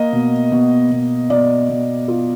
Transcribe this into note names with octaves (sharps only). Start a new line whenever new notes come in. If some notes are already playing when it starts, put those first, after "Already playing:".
Already playing: A#3 D#5
B2
B2
B2
B2 D5
B2
F4